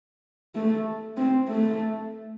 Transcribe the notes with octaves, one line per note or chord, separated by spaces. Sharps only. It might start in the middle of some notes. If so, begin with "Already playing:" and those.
A3
C4
A3